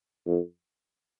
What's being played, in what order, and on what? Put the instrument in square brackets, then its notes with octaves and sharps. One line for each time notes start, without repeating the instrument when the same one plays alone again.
[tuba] F2